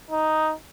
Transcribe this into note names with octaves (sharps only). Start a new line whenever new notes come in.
D#4